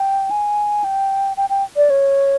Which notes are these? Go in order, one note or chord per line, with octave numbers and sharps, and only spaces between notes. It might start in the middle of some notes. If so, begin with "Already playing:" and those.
Already playing: G5
G#5
G5
G5
G5
D5
C#5